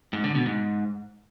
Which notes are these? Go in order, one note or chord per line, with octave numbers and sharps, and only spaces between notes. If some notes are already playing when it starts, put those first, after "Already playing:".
G#2
D3
B2
G#2